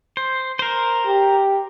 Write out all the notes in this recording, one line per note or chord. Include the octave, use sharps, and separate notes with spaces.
C5
A#4 C5
G4